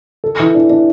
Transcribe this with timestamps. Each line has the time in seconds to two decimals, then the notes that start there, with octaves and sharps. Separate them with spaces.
0.24 A4
0.39 E3
0.55 D4
0.70 D4